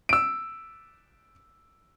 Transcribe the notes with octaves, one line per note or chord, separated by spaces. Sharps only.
E6 D7